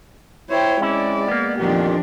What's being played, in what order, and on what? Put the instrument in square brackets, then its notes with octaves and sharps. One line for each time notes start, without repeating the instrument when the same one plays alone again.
[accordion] E4 C#5 [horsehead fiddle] C5 G5
[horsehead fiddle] G#3 D5 [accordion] C4 [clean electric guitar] C#4 E4
[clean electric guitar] A#3 B3
[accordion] F2 A#2 D#3 [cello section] F3 D4 [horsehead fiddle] G4